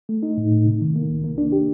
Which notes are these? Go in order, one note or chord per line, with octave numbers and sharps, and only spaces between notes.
A3
D#4
A2
A2
C3
D#3
A#3
C2
A#3
D4
G4